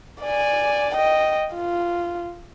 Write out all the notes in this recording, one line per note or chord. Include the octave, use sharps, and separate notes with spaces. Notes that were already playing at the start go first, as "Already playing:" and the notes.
D5 G#5
D#5 G5
F4